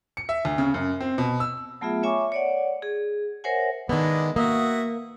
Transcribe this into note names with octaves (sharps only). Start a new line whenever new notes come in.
C#7
E5
D2
C#3
F#2
C4
B2
E6
F#3 A3 B3 F4 G#4 E5
C#5 E5 G#5 B5 C#6 D6
C#5 D5 F#5
G#4
A#4 C5 C#5 E5 F#5 G#5
D#3 G#3 B3 D4 E4
A#3 F#4 E5 D#6